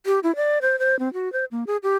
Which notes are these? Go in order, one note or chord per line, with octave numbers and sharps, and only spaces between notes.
G4
E4
D5
C5
C5
C4
F#4
C5
A#3
G#4
G4